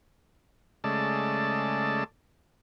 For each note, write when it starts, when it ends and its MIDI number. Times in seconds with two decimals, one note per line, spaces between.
0.84 2.04 49
0.84 2.04 56
0.84 2.04 57
0.84 2.04 74
0.84 2.04 81